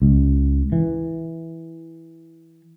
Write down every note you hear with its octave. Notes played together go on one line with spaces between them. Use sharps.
C#2
E3